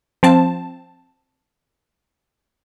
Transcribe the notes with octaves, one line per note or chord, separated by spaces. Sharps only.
F3 C4 A5